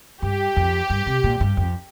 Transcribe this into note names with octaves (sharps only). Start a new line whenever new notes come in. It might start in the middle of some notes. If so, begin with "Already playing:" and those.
G2 G4
F2
G2
C3
A#2
G2
F2